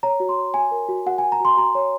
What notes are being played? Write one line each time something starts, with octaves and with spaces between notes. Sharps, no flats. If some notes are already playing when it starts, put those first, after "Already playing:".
C#5 A#5
F#4
C6
C#5
F#4 G#5
A#4
F#4
F#4 F#5
G#5
F#4
A#5
F#4 C6
F#4 A#5
C#5